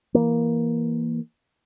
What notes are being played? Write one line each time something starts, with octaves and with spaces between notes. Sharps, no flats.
E3 A#3